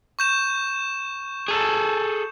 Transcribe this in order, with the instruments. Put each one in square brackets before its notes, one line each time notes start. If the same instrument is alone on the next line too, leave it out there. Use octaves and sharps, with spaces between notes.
[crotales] C#6 G6 E7
[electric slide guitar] G#4 A4